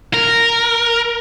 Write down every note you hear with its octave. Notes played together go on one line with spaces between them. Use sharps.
A#4